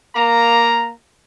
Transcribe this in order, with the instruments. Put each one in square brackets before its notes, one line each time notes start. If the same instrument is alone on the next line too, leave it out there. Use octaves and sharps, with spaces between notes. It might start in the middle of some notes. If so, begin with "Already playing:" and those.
[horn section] A#3 A#5